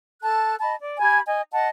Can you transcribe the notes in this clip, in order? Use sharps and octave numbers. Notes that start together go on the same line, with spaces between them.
A4 A5 F#6
D#5 A5 B5
D5
G4 G#5 B5 G#6
D#5 G#5
D#5 F#5 A5